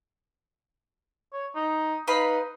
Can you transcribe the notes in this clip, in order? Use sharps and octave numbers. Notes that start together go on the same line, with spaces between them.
C#5
D#4
D#4 B4 F5 B5